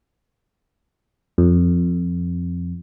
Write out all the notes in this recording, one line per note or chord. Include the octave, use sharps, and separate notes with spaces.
F2